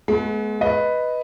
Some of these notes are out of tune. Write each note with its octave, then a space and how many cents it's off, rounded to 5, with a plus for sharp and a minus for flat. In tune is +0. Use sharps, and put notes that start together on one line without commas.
G#3 +40 B3 -15
B4 +0 D#5 +5